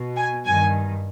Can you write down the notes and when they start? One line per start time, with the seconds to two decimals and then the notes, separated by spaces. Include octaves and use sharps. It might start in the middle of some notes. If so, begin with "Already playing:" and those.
Already playing: B2
0.16 G#5
0.45 G2 D#3 G#5